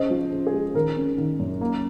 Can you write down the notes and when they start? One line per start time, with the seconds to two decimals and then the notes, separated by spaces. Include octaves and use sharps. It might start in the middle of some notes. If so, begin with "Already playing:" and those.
Already playing: C#3 C5 D#5
0.10 F3
0.32 C#3
0.47 G#4
0.53 G#3
0.74 D#3 A#4
0.97 C#4
1.18 D#3
1.39 F#2
1.61 A#3